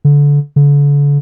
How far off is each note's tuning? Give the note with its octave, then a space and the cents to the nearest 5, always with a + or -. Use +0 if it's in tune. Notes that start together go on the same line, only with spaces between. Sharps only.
D3 -25
D3 -40